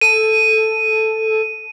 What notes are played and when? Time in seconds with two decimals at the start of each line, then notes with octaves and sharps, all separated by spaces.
0.01 A4 D#7